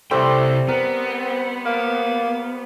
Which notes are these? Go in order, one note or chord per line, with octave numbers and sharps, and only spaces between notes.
C3 G3 A3 E4 C5 F#5 G5
B3 C4 A#4
A#3